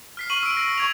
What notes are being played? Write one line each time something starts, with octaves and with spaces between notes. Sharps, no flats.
F6 B6 C7
C#6 D#7 F#7
E6 D7
A#6
C#6 G#6 F7